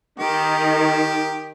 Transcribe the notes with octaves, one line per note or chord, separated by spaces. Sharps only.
D#3 G4